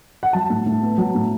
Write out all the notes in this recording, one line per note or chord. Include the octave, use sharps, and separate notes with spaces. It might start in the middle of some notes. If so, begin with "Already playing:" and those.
F#5
F#3 A5
A2
A2
B3
F#3
A2